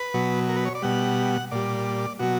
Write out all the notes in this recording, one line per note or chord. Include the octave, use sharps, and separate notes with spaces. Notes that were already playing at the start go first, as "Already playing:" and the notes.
Already playing: B4
B2 F#3
A#4
B4
C#5
D5
B2 G3 F#5
A#2 G3 D5
B2 F#3 F#4